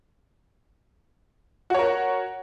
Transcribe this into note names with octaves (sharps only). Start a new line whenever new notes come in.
F#4 A#4 C#5